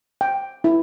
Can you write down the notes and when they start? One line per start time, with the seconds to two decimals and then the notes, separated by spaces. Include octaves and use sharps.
0.21 G5
0.64 E4